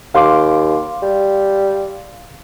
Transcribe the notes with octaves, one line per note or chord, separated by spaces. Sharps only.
D#2 F5 C6 D6
G3